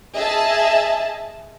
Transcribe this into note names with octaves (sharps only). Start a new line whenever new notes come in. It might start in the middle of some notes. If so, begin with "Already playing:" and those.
G#4 D#5 E5 A5